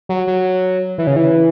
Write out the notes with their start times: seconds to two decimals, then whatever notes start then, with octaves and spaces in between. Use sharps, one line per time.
0.09 F#3
0.27 F#3
0.98 E3
1.07 C#3
1.16 E3